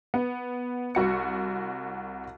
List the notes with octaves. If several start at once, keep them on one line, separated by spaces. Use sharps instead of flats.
B3
C2 F#4 C#7